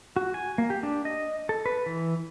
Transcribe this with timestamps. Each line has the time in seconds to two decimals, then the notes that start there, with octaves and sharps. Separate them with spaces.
0.16 F#4
0.34 G#5
0.58 A#3
0.70 G4
0.83 D4
1.05 D#5
1.49 A4
1.66 B4
1.86 E3